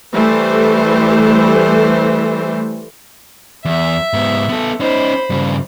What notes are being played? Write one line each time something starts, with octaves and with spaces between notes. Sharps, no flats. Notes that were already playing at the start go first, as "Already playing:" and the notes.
E3 G3 A3 A4 C5
E2 E5
G#2 B3
B3 A4
C#4 D#4 C5 B5
G2 C#3